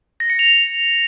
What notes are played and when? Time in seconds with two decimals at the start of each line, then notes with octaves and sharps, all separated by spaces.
0.20 A#6
0.30 C#7
0.39 F7